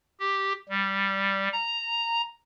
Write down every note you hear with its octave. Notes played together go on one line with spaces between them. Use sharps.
G4
G3
A#5